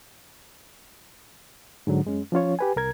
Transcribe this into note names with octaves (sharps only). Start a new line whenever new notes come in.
G#2 D3 F#3
F#2 G#3 C#4
F3 C#4 F4 C#5
G4 B4 G#5
C2 A#4 G#6